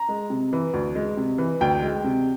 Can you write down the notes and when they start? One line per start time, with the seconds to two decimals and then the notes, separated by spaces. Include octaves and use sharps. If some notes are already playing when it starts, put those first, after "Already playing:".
Already playing: A#5
0.09 G#3
0.30 C3
0.53 E3
0.74 D2
0.95 G#3
1.17 C3
1.38 E3
1.61 D2 G5
1.82 G#3
2.04 C3